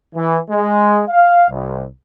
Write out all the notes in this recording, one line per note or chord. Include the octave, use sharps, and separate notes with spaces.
E3
G#3
F5
C2